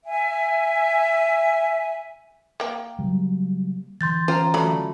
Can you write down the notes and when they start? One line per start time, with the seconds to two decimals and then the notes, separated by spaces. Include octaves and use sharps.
0.04 E5 G#5
2.60 A#3 G5
2.99 C#3 F#3 G3
4.01 D3 E3 C6 G6 A6
4.28 C#4 F4 C5 G5 A#5
4.54 F#3 A3 D5 B5